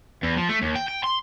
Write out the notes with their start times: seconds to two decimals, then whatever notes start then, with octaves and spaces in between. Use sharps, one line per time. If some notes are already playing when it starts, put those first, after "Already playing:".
0.23 E2
0.37 F3
0.49 A3
0.62 D#2
0.76 G5
0.88 G5
1.04 C6